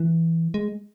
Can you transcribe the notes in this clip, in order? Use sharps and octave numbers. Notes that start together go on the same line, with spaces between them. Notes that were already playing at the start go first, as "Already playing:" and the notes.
Already playing: E3
G#3